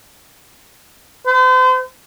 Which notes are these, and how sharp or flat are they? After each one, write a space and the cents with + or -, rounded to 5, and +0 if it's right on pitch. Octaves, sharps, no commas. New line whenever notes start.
C5 -40